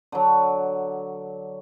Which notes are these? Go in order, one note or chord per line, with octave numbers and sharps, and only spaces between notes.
D3 F#3